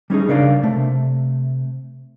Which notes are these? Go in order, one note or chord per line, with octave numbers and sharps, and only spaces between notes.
G3 C#4 D#4 G#4
C#3 D4 A#4 D5 F5
C3 A3